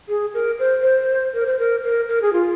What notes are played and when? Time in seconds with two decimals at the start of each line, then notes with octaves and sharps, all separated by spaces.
0.09 G#4
0.34 A#4
0.59 C5
0.82 C5
1.34 A#4
1.46 C5
1.59 A#4
1.84 A#4
2.09 A#4
2.22 G#4
2.33 F4